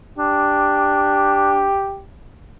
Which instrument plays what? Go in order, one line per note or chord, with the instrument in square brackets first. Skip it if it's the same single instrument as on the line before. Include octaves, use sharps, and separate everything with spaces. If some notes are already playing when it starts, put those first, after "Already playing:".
[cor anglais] D4 [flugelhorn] G4